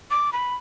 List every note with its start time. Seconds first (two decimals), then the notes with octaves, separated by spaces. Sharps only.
0.11 D6
0.33 B5